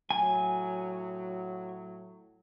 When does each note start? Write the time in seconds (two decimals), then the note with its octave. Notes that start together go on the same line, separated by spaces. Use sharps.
0.11 A2 F#3 G#5